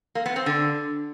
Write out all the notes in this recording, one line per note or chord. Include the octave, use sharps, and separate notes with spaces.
A#3
B3
C4
D3